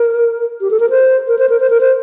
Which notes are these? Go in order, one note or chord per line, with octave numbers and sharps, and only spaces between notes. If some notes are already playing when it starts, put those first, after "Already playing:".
Already playing: A#4
G4
A4
A#4
C5
A#4
C5
A#4
C5
A#4
C5